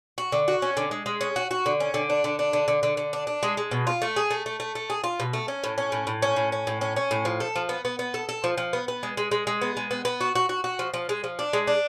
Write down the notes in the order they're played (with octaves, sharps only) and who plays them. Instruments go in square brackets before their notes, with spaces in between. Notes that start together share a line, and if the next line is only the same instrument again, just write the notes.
[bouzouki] F#4
D3
F#4
C#4
D3
G#3
G#3
C#4
F#4
F#4
D3
C#4
D3
D4
D3
D4
D3
D3
D3
D3
D4
D4
G#3
G#3
B2
F4
A3
G#4
A3
A3
A3
A3
G#4
F4
B2
A3
C#4
A2
C#4
A2
A2
C#4
A2
C#4
A2
C#4
C#4
A2
F3
A4
F3
B3
B3
B3
A4
A4
F3
F3
B3
B3
G#3
G#3
G#3
G#3
B3
G#3
B3
B3
F#4
F#4
F#4
F#4
F3
F3
G#3
F3
D4
G#3
D4